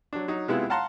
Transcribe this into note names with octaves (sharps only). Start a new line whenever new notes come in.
F#3 D4
F#3 D#4
C3 G#3 B3 E4 F4
F5 F#5 A5 A#5 C6